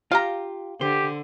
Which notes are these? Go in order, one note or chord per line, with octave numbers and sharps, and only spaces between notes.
F4 G4 F5 A#5
D3 G4 C5